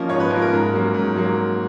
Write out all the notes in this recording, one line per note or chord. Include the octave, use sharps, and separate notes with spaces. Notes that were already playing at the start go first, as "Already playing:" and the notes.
Already playing: F3 A#3 C#4 D#5
G#2 C#5
B4
F3 A#3 C#4 A#4
A#4
G#2
F#3 A#3 C#4
G#2
F#3 A#3